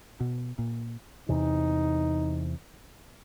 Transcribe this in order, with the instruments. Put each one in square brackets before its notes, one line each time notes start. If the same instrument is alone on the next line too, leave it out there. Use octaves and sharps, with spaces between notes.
[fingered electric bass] B2
A#2
[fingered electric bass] E2 C3 E3 [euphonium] D#4